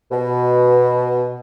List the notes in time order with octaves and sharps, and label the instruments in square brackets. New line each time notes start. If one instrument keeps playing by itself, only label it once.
[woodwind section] B2